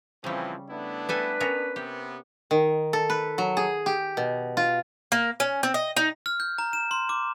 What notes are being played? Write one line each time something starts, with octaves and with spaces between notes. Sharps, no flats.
C#3 E3 F3 G3 C4 C#4
A3 B3 D4 E4
G3 A4 B4 G#5
B3 C#4 A#4
C3 B3 G4
D#3
A4
B4
F#3
G#4
G4
B2
F4
A#3
C#4
C4
D#5
D#4
F6
G6
A#5
E7
C6
D6